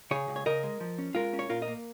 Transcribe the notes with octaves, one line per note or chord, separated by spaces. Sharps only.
C#3 G#4 C#5
C#2
C#5
C#3 A#4 D#5
G#3
F3
C#4
G#3 F4 A#4
C#4
C#5
A#2 F4 A#4
A#4 D#5
A#3